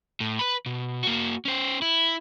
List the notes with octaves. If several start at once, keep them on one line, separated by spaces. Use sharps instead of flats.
A2
B4 B5
B2
A#3 F#4
C#4 C5
E4